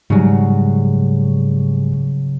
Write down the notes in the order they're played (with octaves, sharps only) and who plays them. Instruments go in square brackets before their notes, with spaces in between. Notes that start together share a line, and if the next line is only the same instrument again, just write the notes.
[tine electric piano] G#2 G3 [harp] C#3 F#3